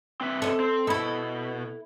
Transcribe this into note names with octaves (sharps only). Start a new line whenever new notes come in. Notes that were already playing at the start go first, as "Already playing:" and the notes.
C4 B4 E5
A4 D#5
C4
B2 E4 A4